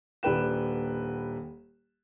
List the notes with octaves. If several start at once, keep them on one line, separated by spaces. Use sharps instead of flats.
D#1 D4 B4 G5 E7